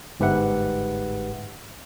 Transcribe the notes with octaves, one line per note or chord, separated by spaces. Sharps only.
G1 G#2 G4 B4 E5 F#5